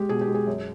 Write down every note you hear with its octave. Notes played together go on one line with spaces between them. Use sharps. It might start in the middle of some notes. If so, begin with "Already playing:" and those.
Already playing: G#3 G4
B2 G#4
G4
G#3
G#4
F#2